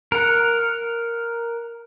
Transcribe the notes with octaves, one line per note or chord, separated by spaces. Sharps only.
A#4 F#5